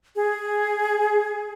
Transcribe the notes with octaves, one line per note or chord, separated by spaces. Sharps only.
G#4